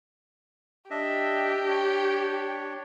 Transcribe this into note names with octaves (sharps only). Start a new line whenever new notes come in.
D4 G4 D#5 E5
D4 C#5